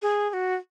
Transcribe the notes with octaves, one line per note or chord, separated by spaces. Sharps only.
G#4
G#4
F#4